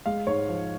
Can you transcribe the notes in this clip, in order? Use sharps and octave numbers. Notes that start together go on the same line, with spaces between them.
G#3 F5
G#2 C#5
F3